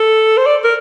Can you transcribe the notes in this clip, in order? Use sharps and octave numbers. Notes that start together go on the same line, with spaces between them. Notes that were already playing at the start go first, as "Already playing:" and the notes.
Already playing: A4
C5
D5
A#4